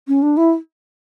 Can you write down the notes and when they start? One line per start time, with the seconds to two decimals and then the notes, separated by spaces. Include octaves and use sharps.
0.08 C#4
0.22 D4
0.37 E4